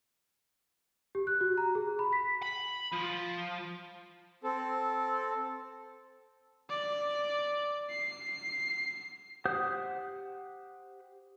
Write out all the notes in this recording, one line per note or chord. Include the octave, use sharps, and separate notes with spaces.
G4
F#6
F#4
A#5
G#4
B5
B6
B5
F3
C4 A4
D5
C7
G4 C5 F#5 D#6 G6